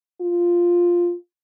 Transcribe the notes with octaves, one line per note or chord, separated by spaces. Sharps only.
F4